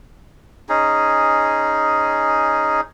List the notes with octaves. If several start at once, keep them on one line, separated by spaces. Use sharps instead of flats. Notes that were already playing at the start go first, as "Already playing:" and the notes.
C#4 D#4 G#4